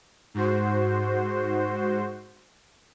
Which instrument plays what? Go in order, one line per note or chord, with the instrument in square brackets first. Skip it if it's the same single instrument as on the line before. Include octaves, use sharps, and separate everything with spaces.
[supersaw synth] G#2 F#4 C5